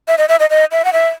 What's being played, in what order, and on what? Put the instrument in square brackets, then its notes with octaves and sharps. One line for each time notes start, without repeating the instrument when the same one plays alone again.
[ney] E5
D#5
E5
D#5
D#5
E5
F#5
E5